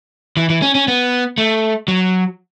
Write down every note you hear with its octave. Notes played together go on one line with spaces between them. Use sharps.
E3
E3
C#4
C#4
B3
A3
F#3